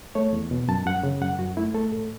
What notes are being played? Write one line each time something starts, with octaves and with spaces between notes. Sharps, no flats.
A3 C#5
E2
B2
F#2 A5
F#2 F#5
C#3
F#2 F#5
F#2 F#4
A3 E4
A3 A4
A2 A4